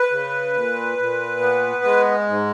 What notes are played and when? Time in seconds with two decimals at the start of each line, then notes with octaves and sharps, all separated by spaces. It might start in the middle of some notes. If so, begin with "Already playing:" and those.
Already playing: B4
0.11 C#3
0.54 A#2
0.98 A#2
1.41 B3
1.84 G#3
2.28 G#2